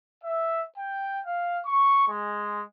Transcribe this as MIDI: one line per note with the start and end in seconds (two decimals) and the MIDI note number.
0.22 0.61 76
0.78 1.19 79
1.25 1.58 77
1.65 2.06 85
2.08 2.62 56